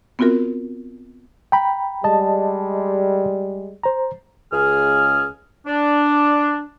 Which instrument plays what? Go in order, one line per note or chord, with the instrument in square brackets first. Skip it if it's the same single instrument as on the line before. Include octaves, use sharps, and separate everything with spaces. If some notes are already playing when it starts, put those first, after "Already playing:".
[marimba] B3 C4 F4 F#4 A#4
[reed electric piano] G5 A#5 B5
[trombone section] G3 G#3 [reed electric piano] D#5 A5
[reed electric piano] C5 A#5
[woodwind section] C#2 G#4 F6
D4